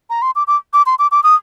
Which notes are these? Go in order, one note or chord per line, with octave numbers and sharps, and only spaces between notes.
A#5
C6
D6
D6
D6
C6
D6
D6
D#6